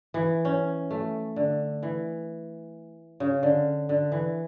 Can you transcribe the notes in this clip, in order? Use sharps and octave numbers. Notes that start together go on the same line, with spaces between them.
E3
C#4
A3
D3
E3
C#3
D3
D3
E3